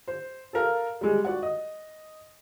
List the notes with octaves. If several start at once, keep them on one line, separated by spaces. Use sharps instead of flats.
C5
A4 A#4 F5
G3 G#3
F#4 D5 F#5
D#5